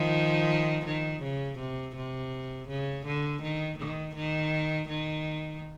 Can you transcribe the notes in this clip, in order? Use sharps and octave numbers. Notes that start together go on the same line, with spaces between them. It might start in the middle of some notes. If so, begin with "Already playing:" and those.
Already playing: D#3 F3
D#3
C#3
C3
C3
C#3
D3
D#3
D#3
D#3
D#3